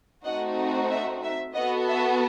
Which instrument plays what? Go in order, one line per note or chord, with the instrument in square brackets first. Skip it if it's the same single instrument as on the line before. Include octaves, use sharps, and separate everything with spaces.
[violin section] A3 C4 D#4 F#4 D#5 F#5
E5
E5
B3 F#4 A4 D#5 F#5
E5